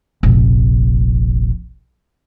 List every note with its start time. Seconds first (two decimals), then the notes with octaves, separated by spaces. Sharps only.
0.23 F1 A#1